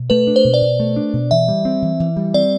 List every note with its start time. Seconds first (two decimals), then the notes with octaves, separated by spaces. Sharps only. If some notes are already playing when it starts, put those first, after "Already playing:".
Already playing: B2
0.10 A3 B4
0.27 D4
0.36 C5
0.44 B2
0.54 D5
0.62 B2
0.80 A3
0.96 D4
1.13 B2
1.31 E3 E5
1.48 G3
1.65 C4
1.82 E3
2.00 E3
2.17 G3
2.34 C4 D5